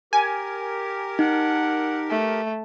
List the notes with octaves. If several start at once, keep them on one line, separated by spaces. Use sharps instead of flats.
G4 A#4 G#5
D#4 F#5
A3